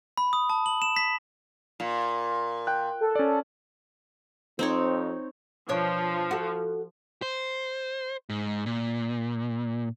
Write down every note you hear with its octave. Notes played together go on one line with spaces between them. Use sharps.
B5
D#6
A5
F#7
E7
B6
A#2
G5 F#6
A4
C#4 D5
F2 C4 D#4 C#5
B2 F3 D4 C#5
F#4 A4
C5
G#2
A#2